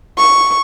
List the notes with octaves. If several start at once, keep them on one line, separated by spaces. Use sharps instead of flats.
C#6